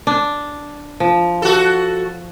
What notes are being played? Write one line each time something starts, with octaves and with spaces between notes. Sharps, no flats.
D4
F3
F#4 A4